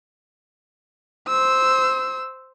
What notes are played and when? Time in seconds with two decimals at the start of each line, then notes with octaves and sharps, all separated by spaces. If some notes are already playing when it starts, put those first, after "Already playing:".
1.28 C5 E6